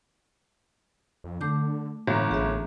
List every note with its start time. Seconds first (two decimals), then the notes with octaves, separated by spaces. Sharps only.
1.24 F2
1.41 D3 A3 D6 G6
2.07 G1 A2 E3 G#3 A#3
2.31 A1 G#4 E5